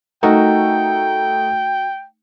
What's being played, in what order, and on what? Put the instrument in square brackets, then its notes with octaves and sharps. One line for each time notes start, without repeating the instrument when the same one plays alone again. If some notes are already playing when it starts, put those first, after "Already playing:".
[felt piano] A3 D#4 [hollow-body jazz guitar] F#4 A#4 [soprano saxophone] G5